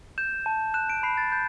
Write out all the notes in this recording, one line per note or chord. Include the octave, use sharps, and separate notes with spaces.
G6 E7
A5
F#6 E7
D7
B5 C7
A6
G6 A6